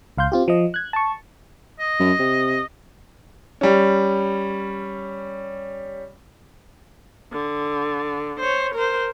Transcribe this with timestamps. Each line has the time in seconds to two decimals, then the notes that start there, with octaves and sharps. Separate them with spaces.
0.18 C#2 F5 C6 G6
0.32 C4 F4 G4
0.48 F3 D#5
0.74 F#6 G#6
0.93 A5 C#6
1.79 D#5
1.99 F#2
2.19 C3
3.61 G3 C#4
7.32 D3
8.40 C5 C#5
8.75 A#4 C5